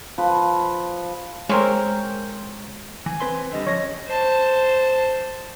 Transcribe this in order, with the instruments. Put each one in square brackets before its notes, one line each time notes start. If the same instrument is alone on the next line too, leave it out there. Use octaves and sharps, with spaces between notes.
[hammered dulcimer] F3 B4
[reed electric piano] G#3 [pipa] C4 C#4 [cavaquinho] A#4 C5
[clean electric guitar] E3 [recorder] G#5
[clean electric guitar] C4 B4 C6
[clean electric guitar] D3 G3 [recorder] D#5
[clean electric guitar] F3 C#4 [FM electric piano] C#5 A#6
[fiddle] C5 A5